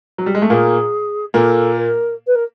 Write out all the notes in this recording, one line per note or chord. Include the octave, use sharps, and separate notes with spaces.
F#3
G3
G#3
A3
A#2 A#3 G#4
A#2 A#3 A4
A#4
B4
A#4